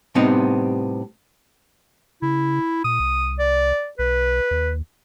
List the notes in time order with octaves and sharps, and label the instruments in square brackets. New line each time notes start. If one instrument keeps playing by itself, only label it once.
[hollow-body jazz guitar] A2 C3 G3 B3 C4 D#4
[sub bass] C#3 [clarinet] E4
[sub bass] A#2 [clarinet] D#6
[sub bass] C2
[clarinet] D5
[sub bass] B1 [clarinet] B4
[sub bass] D#2